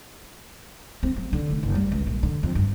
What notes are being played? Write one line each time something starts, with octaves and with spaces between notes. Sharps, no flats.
C4
F#3
D3
F1
F#1
G3
C#2
A#1
D3
F2
G2